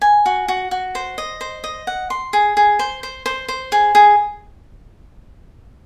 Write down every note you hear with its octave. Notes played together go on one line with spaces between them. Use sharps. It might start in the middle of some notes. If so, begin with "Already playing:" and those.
G#5
F#4
F#4
F#4
C5
D#5
C5
D#5
F#5
C6
G#4
G#4
C5
C5
C5
C5
G#4
G#4